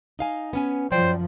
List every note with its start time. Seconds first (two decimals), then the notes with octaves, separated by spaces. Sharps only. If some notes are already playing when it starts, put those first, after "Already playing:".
0.19 D#4 F5 G#5
0.53 B3 C#4 G#5
0.92 F#2 F3 F#3 C5 D5 G5